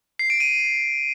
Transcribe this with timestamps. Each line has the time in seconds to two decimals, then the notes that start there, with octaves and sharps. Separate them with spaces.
0.19 C7
0.30 D7
0.40 D#7